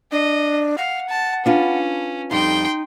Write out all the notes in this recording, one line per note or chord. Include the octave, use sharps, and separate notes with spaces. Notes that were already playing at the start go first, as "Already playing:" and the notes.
D4 D#5
F5 F#5
A5
C#4 D4 F4 B4
F2 G3 D#4 G5 C6